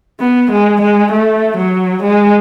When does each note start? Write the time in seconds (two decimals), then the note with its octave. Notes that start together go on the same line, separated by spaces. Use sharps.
0.20 B3
0.51 G#3
0.81 G#3
1.12 A3
1.57 F#3
2.03 G#3